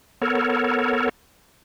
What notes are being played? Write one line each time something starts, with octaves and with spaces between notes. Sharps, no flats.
B3 A4 A#4 C#5